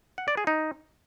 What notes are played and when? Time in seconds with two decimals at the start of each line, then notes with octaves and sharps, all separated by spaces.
0.18 F#5
0.28 D5
0.37 G#4
0.47 D#4